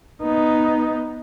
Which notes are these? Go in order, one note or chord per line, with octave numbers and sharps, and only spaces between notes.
B3 D#4